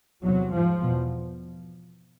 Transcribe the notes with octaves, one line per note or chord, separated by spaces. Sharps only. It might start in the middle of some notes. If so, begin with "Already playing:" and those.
E2 C3 F#3
G#2 F3
E2 B2